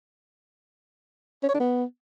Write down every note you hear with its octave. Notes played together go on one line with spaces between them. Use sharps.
C#4
C#5
D4
B3